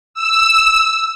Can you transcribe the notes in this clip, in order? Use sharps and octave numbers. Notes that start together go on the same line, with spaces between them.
E6